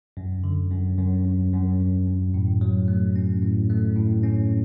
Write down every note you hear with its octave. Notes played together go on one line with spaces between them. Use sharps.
F#2
D3
F#2
F#2
F#2
F#2
F#2
F#2
A2
F#3
A3
C#4
A2
A3
A2
C#4